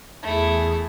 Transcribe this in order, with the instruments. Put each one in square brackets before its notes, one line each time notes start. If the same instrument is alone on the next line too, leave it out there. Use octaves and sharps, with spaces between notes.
[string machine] E2 G#4 [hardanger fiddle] A3 E4